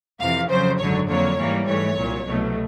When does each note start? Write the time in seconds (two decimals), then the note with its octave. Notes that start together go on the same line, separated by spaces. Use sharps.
0.20 F2 C3 E3 F5
0.50 F2 C#3 F#3 C5
0.79 G#1 F#2 D3 F#3 C#5
1.09 F2 D3 F#3 A#3 C#5
1.38 G#2 E3 G3 A#3
1.67 G#2 E3 A3 C#5
1.98 C2 A#2 F#3
2.27 C2 B2 F#3 A3